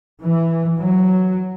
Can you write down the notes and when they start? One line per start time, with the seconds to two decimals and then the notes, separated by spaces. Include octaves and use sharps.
0.22 E3
0.79 F#3